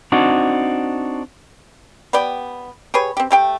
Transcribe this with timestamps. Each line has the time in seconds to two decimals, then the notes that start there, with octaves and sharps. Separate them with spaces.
0.12 C4 D4 D#4 F#4
2.13 B3 G4 D5 G5
2.94 G4 G#4 B4 C#5
3.17 C4 G4
3.31 A3 G4 G5